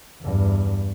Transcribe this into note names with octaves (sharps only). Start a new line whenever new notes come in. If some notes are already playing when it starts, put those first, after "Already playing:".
E2 G2